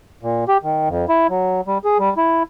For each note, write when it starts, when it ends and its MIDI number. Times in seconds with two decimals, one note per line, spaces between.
0.23 0.44 46
0.48 0.58 67
0.63 0.89 51
0.89 1.06 41
1.09 1.27 64
1.30 1.61 54
1.67 1.78 55
1.85 1.98 68
1.99 2.14 55
2.17 2.43 64